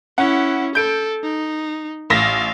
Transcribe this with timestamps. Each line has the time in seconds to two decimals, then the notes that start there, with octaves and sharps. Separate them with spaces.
0.18 C#4 E4 F#5
0.75 A4 G6 D7
1.23 D#4
2.10 A1 F5 A#6